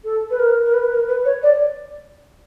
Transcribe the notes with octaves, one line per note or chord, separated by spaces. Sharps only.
A4
B4
A#4
A#4
B4
A#4
B4
C#5
D5